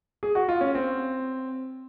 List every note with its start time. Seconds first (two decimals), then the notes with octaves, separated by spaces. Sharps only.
0.23 G#4
0.35 F#4
0.49 F4
0.61 C#4
0.75 C4